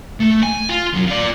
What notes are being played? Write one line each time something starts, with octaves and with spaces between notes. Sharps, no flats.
A3
G#5
F4
F#2 F#3
F4 D5